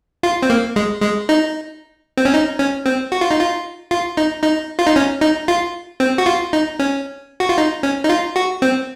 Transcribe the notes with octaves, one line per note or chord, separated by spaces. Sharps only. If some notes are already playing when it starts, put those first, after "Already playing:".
F4
C4
A#3
G#3
G#3
D#4
C4
C#4
D#4
C#4
C4
F#4
F4
D#4
F4
F4
D#4
D#4
F4
D#4
C#4
D#4
F4
C4
F#4
F4
D#4
C#4
F#4
F4
D#4
C#4
D#4
F4
F#4
C4